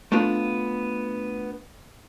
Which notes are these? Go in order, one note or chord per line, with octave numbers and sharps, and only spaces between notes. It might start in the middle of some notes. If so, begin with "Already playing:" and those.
A3 B3 D4 F4